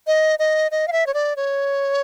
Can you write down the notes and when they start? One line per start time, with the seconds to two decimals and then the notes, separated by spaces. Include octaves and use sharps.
0.07 D#5
0.39 D#5
0.71 D#5
0.88 F5
0.92 E5
1.07 C#5
1.14 D5
1.37 C#5